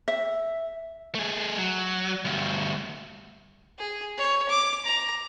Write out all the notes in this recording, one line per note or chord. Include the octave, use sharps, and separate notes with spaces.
E5
A3 G#4
F#3
D2 G2
G#4
C#5
D6
A#5